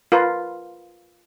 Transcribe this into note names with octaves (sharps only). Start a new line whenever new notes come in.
F4 A#4 B4